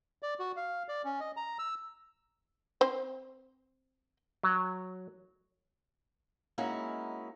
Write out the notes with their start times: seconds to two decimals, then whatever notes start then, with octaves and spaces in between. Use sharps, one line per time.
0.23 D5
0.39 F#4
0.57 F5
0.89 D5
1.05 C#4
1.20 D#5
1.37 A#5
1.59 E6
2.81 C4 C5
4.43 F#3
6.58 G#3 A#3 C#4 D#4 E4 F#4